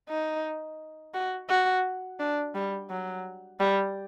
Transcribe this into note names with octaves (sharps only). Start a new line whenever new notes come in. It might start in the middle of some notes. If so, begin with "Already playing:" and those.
D#4
F#4
F#4
D4
G3
F#3
G3